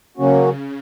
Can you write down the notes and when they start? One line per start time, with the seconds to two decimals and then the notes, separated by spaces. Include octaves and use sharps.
0.17 C#3 F#3 A#3 C#4 F#4